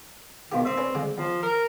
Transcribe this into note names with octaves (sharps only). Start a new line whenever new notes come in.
B2 D#3 F4 G4
C4 E5 D#6
C#4 D4 B4
D3 F3 G#3
D#2 F3
A#4